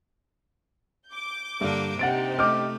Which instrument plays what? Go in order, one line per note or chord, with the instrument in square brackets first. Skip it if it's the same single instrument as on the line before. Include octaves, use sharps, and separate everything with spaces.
[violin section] D6 G6
[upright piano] G2 [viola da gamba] D3 A#3 D4
[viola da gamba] C3 [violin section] D#4 G4 C5 [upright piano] F#5 A6 D7
[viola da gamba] A3 [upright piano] D#5 G6 [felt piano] D6 F6